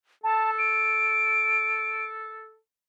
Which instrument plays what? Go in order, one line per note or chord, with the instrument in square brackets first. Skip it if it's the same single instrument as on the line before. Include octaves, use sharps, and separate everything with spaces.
[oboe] A4 [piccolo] A5
[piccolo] D7